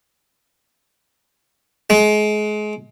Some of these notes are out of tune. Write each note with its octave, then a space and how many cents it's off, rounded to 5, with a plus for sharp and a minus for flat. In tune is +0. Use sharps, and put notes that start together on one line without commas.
G#3 +30